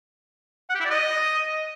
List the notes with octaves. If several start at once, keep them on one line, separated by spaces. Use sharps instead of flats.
F#5
G4
E4
D5
D#5